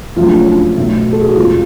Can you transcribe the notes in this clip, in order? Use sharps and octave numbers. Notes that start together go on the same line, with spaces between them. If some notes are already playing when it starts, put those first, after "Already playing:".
F#1 F2 C#3 F#3 A3 F4
D4
C#4
D4
B1 B2 F#3 A3
A4
G#4
F#4
F1 F2 C#3 G#3 B3 F4